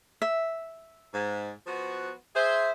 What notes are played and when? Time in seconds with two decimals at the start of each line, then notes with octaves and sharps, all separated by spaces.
0.22 E5
1.14 G#2
1.67 F3 B3 F#4
2.35 G#4 C5 E5